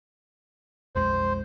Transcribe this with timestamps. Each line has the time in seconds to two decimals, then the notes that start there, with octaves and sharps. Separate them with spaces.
0.96 B1 F2 G#3 C5